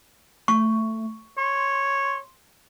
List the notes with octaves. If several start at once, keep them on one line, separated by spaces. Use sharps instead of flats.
A3 C#6
C#5 C6